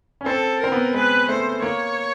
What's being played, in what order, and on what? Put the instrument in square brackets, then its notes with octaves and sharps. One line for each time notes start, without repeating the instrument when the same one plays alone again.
[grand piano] C#4
[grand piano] C4 [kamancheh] A4
[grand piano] C4 [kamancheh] A#4
[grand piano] B3
[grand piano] G#3 [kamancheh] B4
[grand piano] A3 [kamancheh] C5
[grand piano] A#3 [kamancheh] C#5